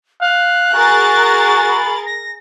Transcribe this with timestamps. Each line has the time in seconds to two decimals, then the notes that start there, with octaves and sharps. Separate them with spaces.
0.21 F5 F#6
0.74 F#4 G#4 A#4 A6
1.68 B5
2.06 A#6